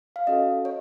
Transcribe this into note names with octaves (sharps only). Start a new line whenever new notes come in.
F5
C#4 F#4 A4 D#5
C#5